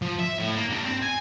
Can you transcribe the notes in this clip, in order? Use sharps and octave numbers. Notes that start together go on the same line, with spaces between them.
F3
E5
A2
A#3
G2
C4
G#5